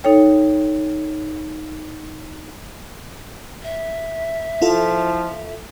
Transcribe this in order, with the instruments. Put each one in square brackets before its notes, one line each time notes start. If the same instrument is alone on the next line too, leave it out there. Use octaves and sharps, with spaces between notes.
[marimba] D#4 A4 C#5 G5
[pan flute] E5
[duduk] F3 [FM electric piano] E4 F4 A4